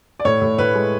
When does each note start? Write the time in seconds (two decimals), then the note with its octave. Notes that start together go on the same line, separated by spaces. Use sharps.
0.20 D5
0.25 A2 C#5
0.42 A2
0.58 A2 B4
0.75 G#3